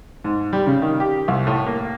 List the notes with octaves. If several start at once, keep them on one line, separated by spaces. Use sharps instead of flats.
G#2
G3
C#3
D#3
G4
C2
A2
A#3